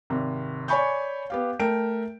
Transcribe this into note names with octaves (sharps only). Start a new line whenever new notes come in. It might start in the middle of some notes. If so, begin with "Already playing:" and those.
G#1 C3
C#5 D5 G#5 B5 C#6 G6
B3 G4 F5
A3 A#4 G5 D7